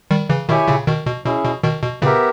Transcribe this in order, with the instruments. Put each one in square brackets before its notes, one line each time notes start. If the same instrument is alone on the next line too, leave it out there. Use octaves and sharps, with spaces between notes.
[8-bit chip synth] D#3 G3
C#3 E3
[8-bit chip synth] B2 D#3 [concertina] E4 G4 C#5 E5 G#5
[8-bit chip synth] A#2 C#3
B2 D#3
B2
[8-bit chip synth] B2 [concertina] C#4 E4 G#4
[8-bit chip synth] B2
B2 D#3
B2
[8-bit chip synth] A#2 C#3 [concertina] B3 G4 A#4 E5